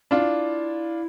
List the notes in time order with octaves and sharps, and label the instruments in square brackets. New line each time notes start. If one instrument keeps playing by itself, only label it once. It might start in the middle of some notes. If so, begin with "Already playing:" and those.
[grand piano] D4 F4 [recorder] E4